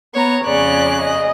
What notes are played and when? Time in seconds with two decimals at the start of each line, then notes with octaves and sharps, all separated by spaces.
0.15 B3 C#5 A#5
0.45 F2 C#3 C#5 D5 F#6
1.01 D#5